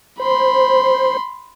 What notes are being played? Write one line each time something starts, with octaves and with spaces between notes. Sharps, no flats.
C5 B5 C6